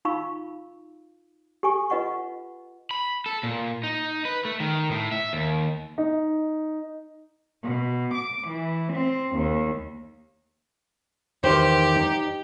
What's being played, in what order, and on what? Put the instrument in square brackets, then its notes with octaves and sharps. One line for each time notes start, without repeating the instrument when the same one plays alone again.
[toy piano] D#4 F4 F5 B5 C#6 E6
G4 A4 G#5 C#6
F4 B4 D#5 F#5 C#6
[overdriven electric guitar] B5
A4
A#2
D#4
B4
A3
D#3
A2
E5
D#2
[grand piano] D#4
[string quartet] B2
D6
E3
C4
D#2
[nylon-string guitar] E2 D#3 C5 [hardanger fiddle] G4
[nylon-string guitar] D#4